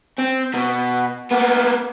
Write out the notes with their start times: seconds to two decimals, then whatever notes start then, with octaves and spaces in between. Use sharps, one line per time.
0.18 C4
0.54 B2
1.31 A#3 B3